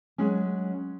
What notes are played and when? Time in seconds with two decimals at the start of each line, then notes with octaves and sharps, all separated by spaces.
0.18 F#3 G#3 C#4